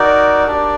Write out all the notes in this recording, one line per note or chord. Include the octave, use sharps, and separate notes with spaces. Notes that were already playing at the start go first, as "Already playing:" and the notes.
Already playing: D#4 F#4 A#4 D5
D4 G4 A#4 D5